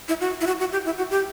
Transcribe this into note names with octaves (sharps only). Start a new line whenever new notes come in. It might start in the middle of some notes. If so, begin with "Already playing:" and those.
E4
F#4
E4
F#4
F#4
G4
E4
F#4
G4